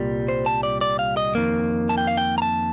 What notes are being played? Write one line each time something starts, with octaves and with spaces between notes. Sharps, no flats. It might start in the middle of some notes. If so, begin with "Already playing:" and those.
Already playing: C2 A#2 G3
C5
A5
D5
D5
F5
D#5
F2 D#3 A#3
A5
G5
F5
G5
A#5
A5